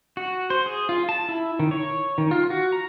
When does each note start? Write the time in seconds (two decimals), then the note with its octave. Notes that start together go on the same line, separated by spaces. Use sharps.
0.17 F#4
0.50 C5
0.66 G#4
0.89 F4
1.09 A5
1.29 E4
1.59 D#3
1.71 C#5
2.18 D#3
2.31 F4
2.50 F#4
2.72 A#5